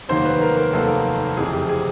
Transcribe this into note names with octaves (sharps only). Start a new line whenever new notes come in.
F1 D#2 D#3 F#3 A#3 C5
B4
A#4
A#4
F1 D#2 D#3 F#3 A#3 A4
F#1 F2 C3 E3 G#4
G4
G#4